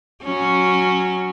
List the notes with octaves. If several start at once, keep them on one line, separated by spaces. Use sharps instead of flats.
F#3 C#4